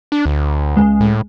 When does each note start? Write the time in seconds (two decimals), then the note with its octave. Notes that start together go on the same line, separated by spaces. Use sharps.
0.12 D4
0.26 D2
0.75 C#2 G#3
1.01 A2